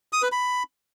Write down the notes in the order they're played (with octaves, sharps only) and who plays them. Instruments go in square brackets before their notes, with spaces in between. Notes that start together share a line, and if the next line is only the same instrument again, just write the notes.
[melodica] D#6
B4
B5